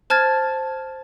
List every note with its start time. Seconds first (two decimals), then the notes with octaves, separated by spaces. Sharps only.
0.10 C5 A5 F6 G#6 A6